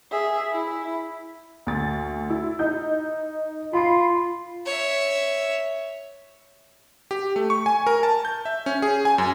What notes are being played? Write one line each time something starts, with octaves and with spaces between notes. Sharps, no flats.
G#4 E5
E4
D2 A6
E4
D#4 G6
F4 B5 C7
C#5 E5
G4
A3
C#6
G#5
A#4
A5
G6
E5
C#4
G#4
G#5
F#2